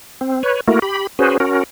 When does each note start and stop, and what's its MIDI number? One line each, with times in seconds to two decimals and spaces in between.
0.21 0.43 60
0.43 0.61 71
0.43 0.61 73
0.68 0.79 57
0.68 0.79 58
0.68 0.79 64
0.68 0.79 66
0.68 0.79 70
0.82 1.07 67
0.82 1.07 83
1.19 1.38 61
1.19 1.38 66
1.19 1.38 68
1.19 1.38 71
1.19 1.38 72
1.40 1.64 61
1.40 1.64 66
1.40 1.64 70